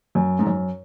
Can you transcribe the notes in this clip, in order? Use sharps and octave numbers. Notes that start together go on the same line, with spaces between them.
F#2
G#2
F#2